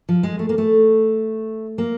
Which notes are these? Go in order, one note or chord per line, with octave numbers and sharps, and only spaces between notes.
F3
G#3
A3
A#3
A3
A#3